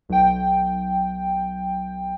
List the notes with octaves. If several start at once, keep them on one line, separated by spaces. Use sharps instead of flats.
B1 G5